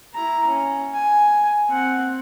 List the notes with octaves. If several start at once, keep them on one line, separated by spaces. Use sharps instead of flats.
E4 A#5
C#4
G#5
C4 F#5